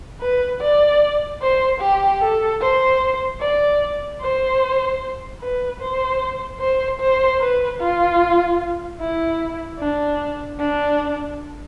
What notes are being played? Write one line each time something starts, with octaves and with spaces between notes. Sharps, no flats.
B4
D5
C5
G4
A4
C5
D5
C5
B4
C5
C5
C5
B4
F4
E4
D4
D4